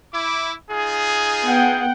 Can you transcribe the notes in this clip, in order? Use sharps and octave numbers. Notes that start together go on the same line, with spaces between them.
E4 D6
D#4 F4 G#4
B3 F#5 G5